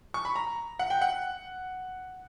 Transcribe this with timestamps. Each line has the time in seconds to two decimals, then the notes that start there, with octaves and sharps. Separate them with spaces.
0.14 C#6
0.25 B5
0.36 A#5
0.79 F#5
0.90 G5
1.01 F#5